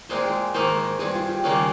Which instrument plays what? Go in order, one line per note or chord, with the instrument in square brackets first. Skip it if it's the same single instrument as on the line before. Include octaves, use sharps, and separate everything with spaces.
[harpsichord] A#2 G#3 C4 [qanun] C5
[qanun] G#4
[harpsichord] G#2 D#3 A#3 D#4 [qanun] C5
[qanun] A#4
[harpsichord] G2 G3 C4 [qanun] G#4
[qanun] F4
G4
[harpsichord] D#2 C#3 G3 A#3 [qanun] G#4